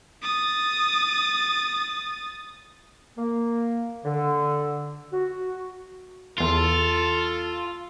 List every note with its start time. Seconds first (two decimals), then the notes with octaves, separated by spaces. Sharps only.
0.22 D#6 A6
3.17 A#3
4.05 D3
5.13 F#4
6.38 E2 F4 A4 C6